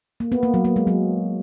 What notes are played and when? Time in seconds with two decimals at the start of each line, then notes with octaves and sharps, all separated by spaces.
0.20 A#3
0.32 B3
0.43 A#3
0.54 F#3
0.65 A#3
0.76 G#3
0.87 F#3